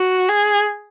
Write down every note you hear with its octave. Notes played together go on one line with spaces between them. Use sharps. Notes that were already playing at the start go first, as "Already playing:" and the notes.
Already playing: F#4
G#4